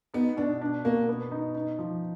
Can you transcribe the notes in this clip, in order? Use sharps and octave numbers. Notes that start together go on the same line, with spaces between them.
B3 D#4
B2 D4
D4
B2 A#3
B3
D#4
D#4
F3